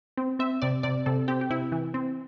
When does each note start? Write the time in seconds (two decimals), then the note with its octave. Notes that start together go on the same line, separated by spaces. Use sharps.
0.17 C4
0.39 C4 E5
0.62 C3 D5
0.83 C3 D5
1.06 C3 A4
1.28 C4 G4
1.41 G4
1.50 C3 E4
1.72 E3
1.94 C4